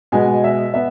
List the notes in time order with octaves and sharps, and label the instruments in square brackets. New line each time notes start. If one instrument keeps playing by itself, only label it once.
[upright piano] B2 G#3 B3 G#5
E5
B3 E5